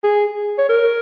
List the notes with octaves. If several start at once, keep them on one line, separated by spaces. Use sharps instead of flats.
G#4
C#5
A#4